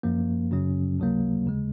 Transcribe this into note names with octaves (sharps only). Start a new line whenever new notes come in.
F#2 F3 A#3
F#2 C#3 F#3 C#4
C#2 C3 F#3 A#3
D#2 C#3 G#3